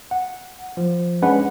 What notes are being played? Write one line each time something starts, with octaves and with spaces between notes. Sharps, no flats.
F#5
F3
G#3 C#4 D4 B4 F#5